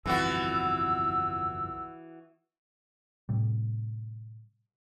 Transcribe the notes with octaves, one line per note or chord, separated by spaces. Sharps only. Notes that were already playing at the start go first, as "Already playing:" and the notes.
G1 C2 F2 E3 B3 F#4 E6
A2 C3 G3